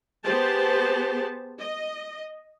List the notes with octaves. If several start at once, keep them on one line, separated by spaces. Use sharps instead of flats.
B3 G4 G#4 C5 A5
D#5